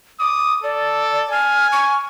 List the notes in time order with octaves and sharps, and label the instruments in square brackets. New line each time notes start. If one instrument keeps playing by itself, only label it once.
[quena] D6 [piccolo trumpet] D#6
[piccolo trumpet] A4 [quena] D5
[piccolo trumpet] G#5 [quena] F6
[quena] C#6